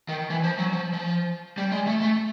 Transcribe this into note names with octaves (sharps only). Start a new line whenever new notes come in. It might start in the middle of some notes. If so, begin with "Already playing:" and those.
D#3
E3
F3
F#3
F3
F3
G3
G#3
A3
A3